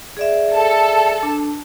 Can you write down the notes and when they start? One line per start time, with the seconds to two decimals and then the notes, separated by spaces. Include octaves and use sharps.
0.17 G#4 D5 E5
0.53 A4
1.23 D4